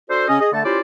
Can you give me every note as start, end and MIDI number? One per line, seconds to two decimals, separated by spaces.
0.10 0.25 62
0.10 0.25 66
0.10 0.25 69
0.10 0.25 72
0.28 0.37 49
0.28 0.37 61
0.28 0.37 75
0.40 0.48 68
0.40 0.48 75
0.53 0.63 50
0.53 0.63 57
0.53 0.63 81
0.65 0.80 61
0.65 0.80 64
0.65 0.80 65
0.65 0.80 67
0.65 0.80 72
0.65 0.80 74